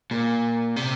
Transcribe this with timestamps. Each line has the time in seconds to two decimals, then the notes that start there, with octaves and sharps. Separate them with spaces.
0.11 A#2
0.76 C3